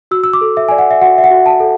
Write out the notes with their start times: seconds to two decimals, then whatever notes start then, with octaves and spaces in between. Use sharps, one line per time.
0.11 F#4 E6
0.24 E6
0.33 D6
0.41 A4
0.57 E5
0.68 D5 G#5
0.79 F#5
0.91 E5
1.01 F#4 F#5
1.18 E5
1.24 F#5
1.31 F#4
1.46 A5
1.60 A4